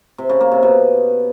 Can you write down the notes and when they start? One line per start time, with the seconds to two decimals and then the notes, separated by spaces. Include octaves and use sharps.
0.18 C3
0.29 C#3
0.41 A#3
0.52 C3
0.63 B2